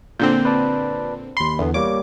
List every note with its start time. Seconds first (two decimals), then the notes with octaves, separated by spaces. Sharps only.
0.20 A#2 D3 C4 G6
0.45 B4 D5 A5
1.37 D#2 B5 C6
1.59 E2 D3 B3
1.74 G3 A#3 C#5 D6